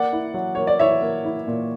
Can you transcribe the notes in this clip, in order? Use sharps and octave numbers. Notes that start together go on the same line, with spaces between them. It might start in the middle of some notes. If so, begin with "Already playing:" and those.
Already playing: A#3 D5 F#5
E4
F#3
A#3 C#5
D5
E4 C#5 E5
A#3
E4
A#2